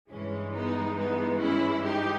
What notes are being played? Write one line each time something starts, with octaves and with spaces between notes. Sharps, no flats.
G2 E3 G#3 C#4
B3 D#4
B3 D#4
C#4 E4
D#4 G4